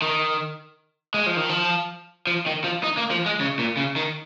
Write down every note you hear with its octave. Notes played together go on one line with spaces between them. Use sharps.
D#3
G#3
F3
D#3
F3
F3
D#3
F3
D#4
A#3
F3
G#3
C#3
A#2
C#3
D#3